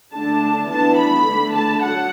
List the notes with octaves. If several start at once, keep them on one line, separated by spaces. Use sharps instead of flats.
D3 A3 D4 A5
E3 B3 D4 A5
B5
D3 A3 D4
A5
F#3 F#5